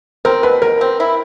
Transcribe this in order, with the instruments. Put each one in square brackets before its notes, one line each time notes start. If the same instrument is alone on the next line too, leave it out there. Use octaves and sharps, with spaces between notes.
[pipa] C4 [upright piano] A#4
[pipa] B2 [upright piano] B4
[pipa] B2 [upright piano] A#4
[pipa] C4
E4